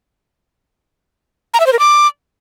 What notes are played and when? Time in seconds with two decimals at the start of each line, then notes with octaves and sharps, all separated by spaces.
1.54 A#5
1.60 E5
1.66 C5
1.73 A#4
1.79 D6